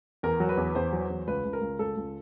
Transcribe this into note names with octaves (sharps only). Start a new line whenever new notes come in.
E2 A#4
F#3
B4
E2
E2 C5
F#3
E2
C#2 B4
C#2
A#4
C#2
C#2 A4
C#2